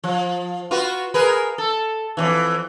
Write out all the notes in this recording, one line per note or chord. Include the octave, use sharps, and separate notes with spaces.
F3
F4 F#4 B4
G#4 A#4 B4
A4
F2 C#3 E3